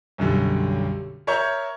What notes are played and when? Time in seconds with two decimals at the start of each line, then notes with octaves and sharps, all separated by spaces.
0.18 B1 F#2 D3 G3
1.27 A#4 C#5 E5 A#5 C#6 G6